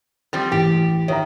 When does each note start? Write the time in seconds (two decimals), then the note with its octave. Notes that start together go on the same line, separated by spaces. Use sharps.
0.33 F3 G3 C4 A6
0.52 A1 G4
1.08 D#3 C#5 E5 A#5